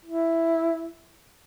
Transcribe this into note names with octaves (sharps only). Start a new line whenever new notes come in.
E4